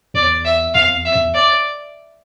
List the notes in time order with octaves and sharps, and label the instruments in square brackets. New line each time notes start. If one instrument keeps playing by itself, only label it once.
[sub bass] E2 [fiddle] D5
[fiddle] E5
[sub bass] E2 [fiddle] F5
[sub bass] F2
E2
[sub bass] F2 [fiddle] E5
[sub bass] E2
[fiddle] D5